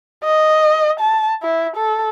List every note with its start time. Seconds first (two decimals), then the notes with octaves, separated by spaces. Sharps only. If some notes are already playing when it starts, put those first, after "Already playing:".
0.24 D#5
1.00 A5
1.43 E4
1.76 A4